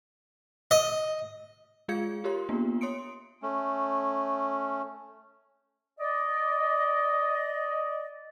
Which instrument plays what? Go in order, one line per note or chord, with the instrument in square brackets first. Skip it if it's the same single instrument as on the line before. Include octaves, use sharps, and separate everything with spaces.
[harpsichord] D#5
[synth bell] G#3 F4 G#4 F5 G#6 C#7
F4 G4 A#4 C#5 C6
A#3 B3 D4 F4
C#5 C6 D#6 C#7 D7
[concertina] A3 C#4
[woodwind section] D5 D#5